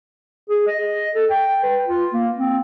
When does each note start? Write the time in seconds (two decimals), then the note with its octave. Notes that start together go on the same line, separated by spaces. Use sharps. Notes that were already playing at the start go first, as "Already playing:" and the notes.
0.49 G#4
0.67 D#5
1.15 A4
1.30 G5
1.63 B4
1.87 F4
2.13 A#3
2.38 C4